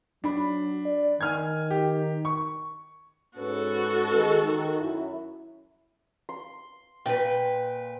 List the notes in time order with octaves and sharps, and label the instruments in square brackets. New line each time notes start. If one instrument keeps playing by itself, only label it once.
[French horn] F#3 [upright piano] D4 B5
[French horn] D5
[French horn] D#3 [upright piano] G#5 F6 G#6
[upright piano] G4
C#6
[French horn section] G#2 C#4 B4 [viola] F#4 A4
[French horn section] D#3 G#3
D#3
F#2 E4
[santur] C6
[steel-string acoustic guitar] A#2 B4 [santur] G5